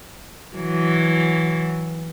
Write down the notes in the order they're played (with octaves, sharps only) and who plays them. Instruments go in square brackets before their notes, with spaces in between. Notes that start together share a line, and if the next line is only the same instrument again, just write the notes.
[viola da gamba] E3 F#3